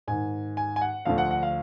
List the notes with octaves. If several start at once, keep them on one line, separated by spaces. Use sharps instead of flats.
G#2 D#3 G#5
G#5
G#5
F#5
D2 D3 F3 F5
F#5
F#5
F5